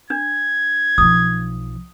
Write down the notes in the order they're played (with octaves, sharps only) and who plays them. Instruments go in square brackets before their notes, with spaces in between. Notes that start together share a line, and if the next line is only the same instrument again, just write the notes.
[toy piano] D4 [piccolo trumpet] G#6
[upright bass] B1 F3 [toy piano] D#6